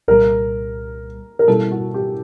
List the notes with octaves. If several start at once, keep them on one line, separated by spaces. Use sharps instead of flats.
C2 A#2 G3 A#3 A#4
A#4
B2 G3 A#3 C#4 E4 A4
F#4
G4